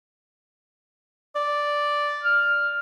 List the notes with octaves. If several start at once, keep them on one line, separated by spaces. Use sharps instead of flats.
D5
F6